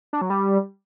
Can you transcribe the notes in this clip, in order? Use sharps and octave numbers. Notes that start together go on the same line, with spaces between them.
D4
F#3
G3